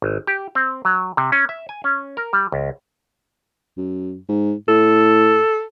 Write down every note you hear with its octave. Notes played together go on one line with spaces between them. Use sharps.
G#1
G4
C4
F#3
C3
C#4
E5
G#5
C#4
A#4
G3
C#2
F#2
G#2
A2 A4